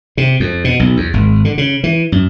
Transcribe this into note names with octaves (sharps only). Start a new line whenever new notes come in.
C3
F2
B2
B1
E2
G#1
D3
C#3
E3
F#2